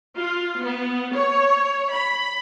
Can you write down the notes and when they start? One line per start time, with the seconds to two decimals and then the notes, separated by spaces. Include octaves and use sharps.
0.17 F4
0.61 B3
1.15 C#5
1.90 B5